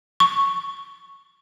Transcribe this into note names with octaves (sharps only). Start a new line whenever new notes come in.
C#6